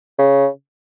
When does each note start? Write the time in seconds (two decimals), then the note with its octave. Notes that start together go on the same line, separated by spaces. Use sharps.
0.19 C#3